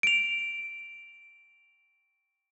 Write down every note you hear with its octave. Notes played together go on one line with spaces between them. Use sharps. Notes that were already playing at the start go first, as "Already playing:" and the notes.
D7 F7